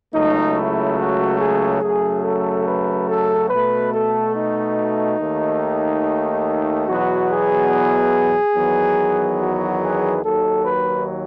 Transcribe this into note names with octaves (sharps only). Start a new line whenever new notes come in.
C#2 C#3 F#3 A3 D#4
E4
F#4
G#4
F#2 C#3 F#3 A3 G#4
A4
B4
A4
B2 A3 B4
A4
D#4
D#2 D#3 A3
E2 B2 F#3 B3 F#4
G#4
E2 D#3 F#3 B3
F#4
G#4
D#2 D#3 F#3 A4
B4